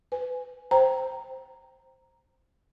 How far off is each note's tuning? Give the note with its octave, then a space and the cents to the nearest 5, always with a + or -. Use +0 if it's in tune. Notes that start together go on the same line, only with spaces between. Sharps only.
B4 +25 G#5 +0
C5 +0 G5 +0 A#5 +0